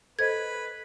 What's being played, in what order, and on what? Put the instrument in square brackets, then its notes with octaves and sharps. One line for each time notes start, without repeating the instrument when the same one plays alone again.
[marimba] A4 C5 D#5 [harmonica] B4 [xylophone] G#6